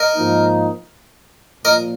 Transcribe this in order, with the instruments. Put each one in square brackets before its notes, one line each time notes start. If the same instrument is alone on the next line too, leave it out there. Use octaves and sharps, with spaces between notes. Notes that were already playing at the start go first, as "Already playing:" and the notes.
Already playing: [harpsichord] A#4 D#5
[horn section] G#2 F3 A#3 D#4
[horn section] A#2 F3 [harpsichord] A#4 D#5